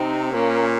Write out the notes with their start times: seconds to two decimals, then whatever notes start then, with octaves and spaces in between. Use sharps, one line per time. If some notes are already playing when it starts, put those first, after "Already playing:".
Already playing: C3 C4 D#4
0.34 A#2 A#3 C#4